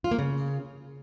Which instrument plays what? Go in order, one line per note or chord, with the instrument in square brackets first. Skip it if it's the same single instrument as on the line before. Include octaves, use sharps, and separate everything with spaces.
[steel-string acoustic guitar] F4
A#3
C#3